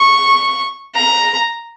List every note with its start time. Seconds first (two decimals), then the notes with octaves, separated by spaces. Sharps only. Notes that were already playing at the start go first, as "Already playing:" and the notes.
Already playing: C#6
0.95 A#5